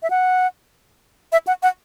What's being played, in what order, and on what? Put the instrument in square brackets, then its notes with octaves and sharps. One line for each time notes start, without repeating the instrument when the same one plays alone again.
[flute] E5
F#5
E5
F#5
F#5